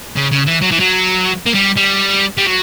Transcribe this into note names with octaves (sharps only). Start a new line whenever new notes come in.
C#3
C#3
E3
F#3
E3
F#3
A#3
G3
G3
G3
F#3